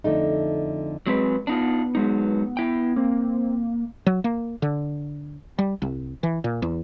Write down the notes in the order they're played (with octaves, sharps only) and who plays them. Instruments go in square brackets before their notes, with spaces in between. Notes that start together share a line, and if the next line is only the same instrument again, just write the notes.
[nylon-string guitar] F2 D3 A3 D#4
[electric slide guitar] F#3 C4 B4 [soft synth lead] G#3
[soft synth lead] B3 [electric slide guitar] D4 D#4 F4
[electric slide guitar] F#3 G#3 D#4
E4 G5
[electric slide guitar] A#3 [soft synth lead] C4
[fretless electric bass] F#3
A#3
D3
G3
C2
E3
A#2
E2